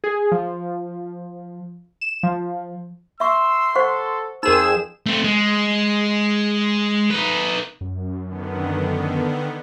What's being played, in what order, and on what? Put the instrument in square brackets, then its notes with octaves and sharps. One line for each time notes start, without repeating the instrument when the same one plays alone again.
[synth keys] G#4
F3
E7
F3
[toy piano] E5 C#6 [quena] C6 [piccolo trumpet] E6
[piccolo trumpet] A4 [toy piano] C5 F#5 C#6
[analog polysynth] F2 G#4 E7 [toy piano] D#4 A#4 [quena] C5 [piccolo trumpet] E6
[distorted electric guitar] A3 C4
G#3
D#4 B4
[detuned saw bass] F#2
[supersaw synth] D3 D#3 B3